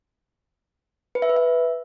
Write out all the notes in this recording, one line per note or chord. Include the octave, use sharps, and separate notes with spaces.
B4
E5
B4
E5